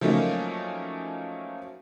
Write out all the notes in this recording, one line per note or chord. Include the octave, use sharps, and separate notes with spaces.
F3 F#3 A3 A#3 C#4 D#4